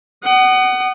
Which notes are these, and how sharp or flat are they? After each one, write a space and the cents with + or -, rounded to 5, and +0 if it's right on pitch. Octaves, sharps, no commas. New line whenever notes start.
F#5 +25 D#6 -20